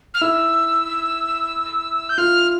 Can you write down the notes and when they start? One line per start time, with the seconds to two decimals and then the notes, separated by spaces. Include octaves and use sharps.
0.14 F6
0.21 E4 E6
2.09 G6
2.18 F4 F6